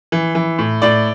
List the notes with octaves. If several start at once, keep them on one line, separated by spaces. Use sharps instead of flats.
E3
E3
A2
A2 D5